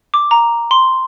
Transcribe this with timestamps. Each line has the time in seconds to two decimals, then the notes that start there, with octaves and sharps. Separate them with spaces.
0.14 D6
0.31 A#5
0.71 C6